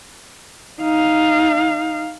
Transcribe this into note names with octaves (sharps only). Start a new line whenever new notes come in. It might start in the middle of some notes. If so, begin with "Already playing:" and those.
D#4 F5